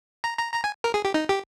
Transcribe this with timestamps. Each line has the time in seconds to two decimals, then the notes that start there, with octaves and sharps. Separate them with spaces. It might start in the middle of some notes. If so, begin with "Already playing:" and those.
0.24 A#5
0.39 A#5
0.54 A#5
0.64 G#5
0.84 A#4
0.94 G#4
1.05 G4
1.14 D#4
1.29 G4